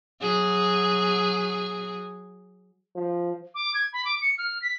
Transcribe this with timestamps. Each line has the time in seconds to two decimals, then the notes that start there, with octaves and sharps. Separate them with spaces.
0.22 F#3 G#4
2.95 F3
3.55 D6
3.74 G#6
3.93 B5
4.05 D6
4.22 C#7
4.38 F6
4.62 B6